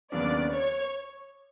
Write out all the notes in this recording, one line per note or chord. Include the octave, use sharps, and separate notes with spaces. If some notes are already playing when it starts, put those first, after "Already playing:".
D#2 C#3 F#3 B3 D4 D5
C#5